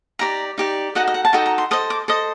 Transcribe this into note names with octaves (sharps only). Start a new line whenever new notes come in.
D#4 G4 D5 A#5
D#4 G4 D5
D#4 F#4 A4 D#5 F#5
D#5
F#5
A5
D#4 F#4 A4 D#5 G5
A#5
C6
A4 C5 D#5 D#6
D6
A4 C5 D#5 D#6